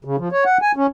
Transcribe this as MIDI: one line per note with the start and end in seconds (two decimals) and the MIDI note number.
0.05 0.16 49
0.18 0.28 53
0.32 0.44 73
0.45 0.58 78
0.62 0.72 80
0.76 0.87 61